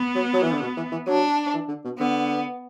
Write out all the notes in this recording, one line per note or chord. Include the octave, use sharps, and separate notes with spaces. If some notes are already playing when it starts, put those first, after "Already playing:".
Already playing: B3
F#3
F#3
E3
D3
B2
E3
E3
F#3 D4
E3
D3
B2
D3 B3